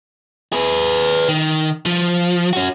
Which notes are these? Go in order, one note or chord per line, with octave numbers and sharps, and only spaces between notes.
G#4 B4
D#3
F3
C#4 F#4